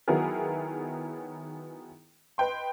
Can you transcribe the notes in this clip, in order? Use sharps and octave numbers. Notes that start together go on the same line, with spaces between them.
D#3 F#3 B3 E4 G#4 A#4
B4 D#5 G5 C6